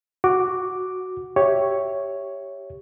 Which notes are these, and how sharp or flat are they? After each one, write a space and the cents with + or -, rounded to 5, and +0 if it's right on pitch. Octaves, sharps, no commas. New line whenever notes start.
F#4 +0 D6 +0
G4 +0 C#5 +0 E5 +0